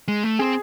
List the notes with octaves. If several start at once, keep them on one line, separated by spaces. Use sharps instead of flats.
G#3
A3
C4 G#4